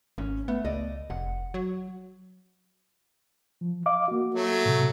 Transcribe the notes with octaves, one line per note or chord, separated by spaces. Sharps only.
G#1 C#4
A3 B3
C#2 D5 D#5
F1 F#5
F#3
F3
D#5 F5 D6
A#3 F#4
F#3 A3
A2 C3